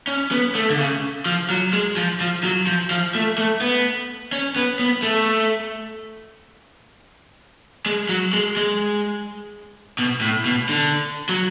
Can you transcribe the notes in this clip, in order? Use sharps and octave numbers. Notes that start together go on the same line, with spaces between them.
C#4
B3
A3
D3
C#3
F3
F#3
G#3
F3
F3
F#3
F3
F3
A3
A3
B3
C#4
B3
B3
A3
G#3
F#3
G#3
G#3
B2
A2
B2
D3
F#3